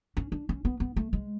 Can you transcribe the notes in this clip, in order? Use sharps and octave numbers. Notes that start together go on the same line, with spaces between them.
C#4
D4
C#4
B3
B3
A3
G#3